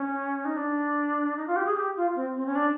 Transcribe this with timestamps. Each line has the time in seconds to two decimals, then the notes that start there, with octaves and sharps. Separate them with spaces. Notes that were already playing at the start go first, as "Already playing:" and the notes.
Already playing: C#4
0.45 D#4
0.57 D4
1.37 D#4
1.47 F4
1.56 G4
1.66 G#4
1.77 G4
1.97 F4
2.16 C4
2.36 C4
2.46 C#4
2.55 D4